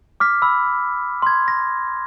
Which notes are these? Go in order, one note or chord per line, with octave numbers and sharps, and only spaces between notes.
D6 F6 B6
B5 E6
C6 G#6
A#6